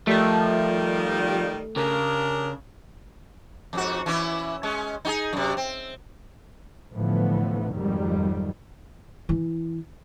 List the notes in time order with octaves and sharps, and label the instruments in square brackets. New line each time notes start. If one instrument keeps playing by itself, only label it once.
[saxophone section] D#3 G3 [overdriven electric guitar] F3 [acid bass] A3
[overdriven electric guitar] C#3 [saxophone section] D4 G4 A#4
[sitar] F2 G#2 F#4
E3 C#4 E4
G#3 C#4
D#4 F#4 G#4
F#2 C3
C4
[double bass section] A2 D3 E3 F3 B3
F2 G#2 D#3 F#3 G3
[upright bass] E3 E4